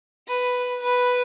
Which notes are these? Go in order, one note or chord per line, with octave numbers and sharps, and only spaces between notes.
B4
B4